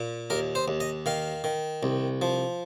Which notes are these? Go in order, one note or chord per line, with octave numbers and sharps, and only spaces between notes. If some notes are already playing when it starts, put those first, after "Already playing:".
Already playing: A#2
D#2 A#4
C5
D#2
D#5
D#3 F5
D#3
C2
F3